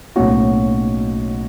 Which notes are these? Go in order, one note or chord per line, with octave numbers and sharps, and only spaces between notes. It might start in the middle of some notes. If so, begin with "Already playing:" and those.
B1 A2 F#3 A#3 C#4 F#4